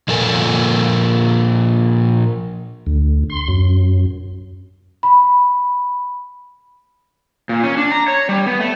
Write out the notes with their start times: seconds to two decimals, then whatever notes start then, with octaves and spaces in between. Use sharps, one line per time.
0.08 A#2 F3 A4 A#4 G#5
2.87 D2
3.30 C6
3.48 F#2
5.03 B5
7.49 A#2
7.64 C#4
7.77 D4
7.92 A#5
8.08 C#5
8.29 G3
8.46 B3
8.60 A3